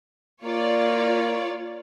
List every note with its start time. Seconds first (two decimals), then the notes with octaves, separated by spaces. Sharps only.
0.44 A#3 F4 C#5 D5